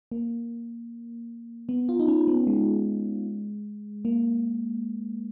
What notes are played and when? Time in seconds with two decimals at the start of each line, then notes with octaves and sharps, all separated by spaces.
0.12 A#3
1.69 B3
1.89 F4
1.99 D#4
2.08 C#4
2.28 B3
2.47 G#3
4.05 A#3